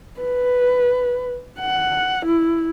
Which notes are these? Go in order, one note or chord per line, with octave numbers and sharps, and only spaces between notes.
B4
F#5
E4